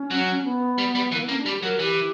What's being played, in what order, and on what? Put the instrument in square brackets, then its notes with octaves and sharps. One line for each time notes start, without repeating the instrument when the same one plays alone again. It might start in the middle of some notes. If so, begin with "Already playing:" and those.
Already playing: [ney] C#4
[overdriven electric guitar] F#3
[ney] B3
[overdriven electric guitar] G3
G3
[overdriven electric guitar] E3 [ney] A#3
[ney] B3
[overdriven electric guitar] A#3 [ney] C#4
[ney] D4
[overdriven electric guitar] G3 [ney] G4
[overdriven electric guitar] F#3 [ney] A#4
[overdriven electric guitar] E3 [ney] G4